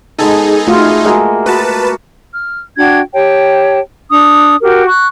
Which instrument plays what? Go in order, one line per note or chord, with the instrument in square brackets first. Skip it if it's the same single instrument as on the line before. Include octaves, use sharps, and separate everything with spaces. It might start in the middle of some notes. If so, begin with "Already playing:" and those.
[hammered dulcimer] G#3 B3 A4 [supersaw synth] D#4 G#4
[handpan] A3 F4 [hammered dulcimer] F#4
[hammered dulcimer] G#3 A#3 F#4
[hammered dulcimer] F#4 [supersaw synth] B4 A5
[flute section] F6
D4 F#4 G5 G#6
G4 C#5 G5 A5
D4 D#6
F#4 G4 A#4
C#6 F#6